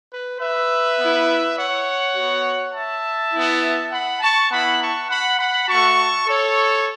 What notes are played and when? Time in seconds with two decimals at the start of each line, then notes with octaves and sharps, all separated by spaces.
0.10 B4
0.39 B4 E5
0.98 B3 E4
1.57 C#5 F#5
2.16 B3 F#4
2.74 E5 A5
3.32 B3 E4
3.92 F#5 B5
4.21 A5 C#6
4.50 B3 E4 F#5 B5
4.80 A5 C#6
5.09 F#5 B5
5.38 F#5 B5
5.68 A3 F#4 A5 C#6
6.27 A4 C#5